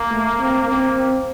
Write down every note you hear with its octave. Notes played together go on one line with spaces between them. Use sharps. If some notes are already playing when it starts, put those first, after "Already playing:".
Already playing: A#3
A3
C4
A#3 C4
C4